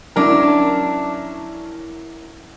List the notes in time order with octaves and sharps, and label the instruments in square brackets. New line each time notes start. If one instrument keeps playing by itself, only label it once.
[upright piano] F#3 C#4 E4 A#4 [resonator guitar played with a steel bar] D4